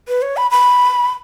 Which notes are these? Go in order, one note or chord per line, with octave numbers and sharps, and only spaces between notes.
B4
C#5
B5
B5